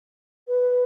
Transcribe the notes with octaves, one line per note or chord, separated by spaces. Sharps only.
B4